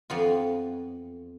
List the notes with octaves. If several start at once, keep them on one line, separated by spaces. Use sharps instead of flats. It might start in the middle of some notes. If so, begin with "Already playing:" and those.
F2 B3 F4